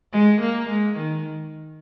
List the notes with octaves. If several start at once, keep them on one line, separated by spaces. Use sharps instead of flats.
G#3
A#3
G#3
D#3